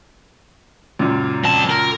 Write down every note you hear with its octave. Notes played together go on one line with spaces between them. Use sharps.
C#2 F#2 A#2
F2 A5
A#4